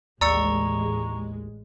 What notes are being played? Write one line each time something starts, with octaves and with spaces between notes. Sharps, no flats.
A1 D#2 G#3 D5 A#5 C#6 E6 C#7